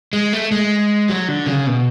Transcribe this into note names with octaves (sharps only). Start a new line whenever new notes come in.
G#3
A3
G#3
F#3
D3
C#3
B2